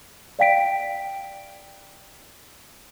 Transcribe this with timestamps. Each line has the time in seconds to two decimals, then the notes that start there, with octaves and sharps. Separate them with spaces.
0.39 D5 F5 G5 B6 D7